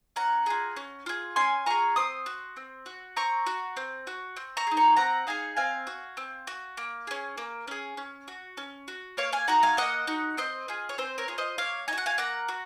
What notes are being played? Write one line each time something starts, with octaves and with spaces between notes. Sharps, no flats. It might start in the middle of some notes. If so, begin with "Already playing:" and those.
C#4 F#5 A#5
F4 G#4
C#4
F4 G#4
C#4 G#5 C6
F4 G#4 A#5 C#6
C4 C6 D#6
F#4
C4
F#4
C4 A#5 C#6
F#4
C4
F#4
C4
A#5 C#6
D#4 G#4
A#5 C#6
C4 F#5 A#5
D#4 G#4 F5 G#5
C4 F5 G#5
F#4
C4
F#4
A#3
C#4 G#4
A#3
C#4 G#4
C#4
F#4
C#4
F#4
A#3 C#5 F5
F5 G#5
D#4 F#4 F#5 A#5
F5 G#5
A#3 D#5 F#5
D#4 F#4
C4 C5 D#5
F4 G#4
C#5
C4 C5
A#4 C#5
F4 G#4
C5 D#5
A#3 C#5 F5
D#4 G#5
F#4 F#5
F5 G#5
A#3 F#5 A#5
F#4